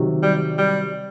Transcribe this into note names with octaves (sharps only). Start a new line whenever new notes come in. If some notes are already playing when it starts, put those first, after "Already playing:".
Already playing: C3 D#3 F#3
G3
G3